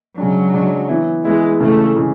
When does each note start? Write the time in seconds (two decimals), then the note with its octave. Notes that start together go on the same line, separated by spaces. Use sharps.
0.18 C#3 F#3 G#3 D4
0.53 C#3 G#3 D4
0.89 E3 B3 E4
1.25 E3 G#3 B3 E4
1.60 C#3 E3 G#3 A3
1.96 C#3 E3 G#3